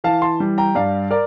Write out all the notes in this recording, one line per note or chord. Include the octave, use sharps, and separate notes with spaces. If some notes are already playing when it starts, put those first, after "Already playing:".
E3 F5 A5
A5 C6
G3
G5 A#5
G2 D5 F5
A#4 D5